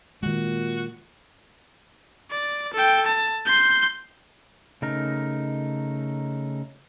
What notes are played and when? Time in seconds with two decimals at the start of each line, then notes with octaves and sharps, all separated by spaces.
0.23 A#2 D#3 G#3 F#4
2.31 D5
2.74 A4 G5
3.06 A5
3.46 C6 G6
4.82 C#3 A3 D#4 A#4